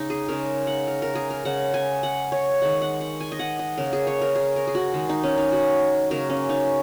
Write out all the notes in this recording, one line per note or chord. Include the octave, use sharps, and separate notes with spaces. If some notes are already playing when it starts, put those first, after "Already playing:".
Already playing: C#3 G#3 D#4
G#4
C#3 G#3 A#4
F#5
A#4
A#4
G#4
A#4
C#3 G#3 F#5
G#5
F#5
C#5
D#3 G#3 F#5
F#5
F#5
G#5
D#5
F#5
D#5
C#3 A#3 A#4
G#4
C#5
A#4
G#4
A#4
G#4
F#4
D#3 G#3
D#4
C#4
D#4
F#4
C#3 F#3 A#3 A#4
C#4
D#4